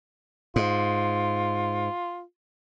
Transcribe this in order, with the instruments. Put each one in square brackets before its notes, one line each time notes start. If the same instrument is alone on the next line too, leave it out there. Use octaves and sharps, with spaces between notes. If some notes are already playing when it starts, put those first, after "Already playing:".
[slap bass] G#2 [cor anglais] F4